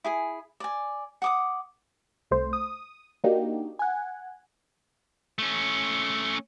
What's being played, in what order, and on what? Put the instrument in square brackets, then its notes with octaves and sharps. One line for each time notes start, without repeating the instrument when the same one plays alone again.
[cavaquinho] E4 G#4 G#5
D5 G#5
F#5 D6 D#6
[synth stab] C2 A3 C5
D#6
A#3 D4 D#4 F#4 G4
F#5 G#5
[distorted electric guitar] A3 C#4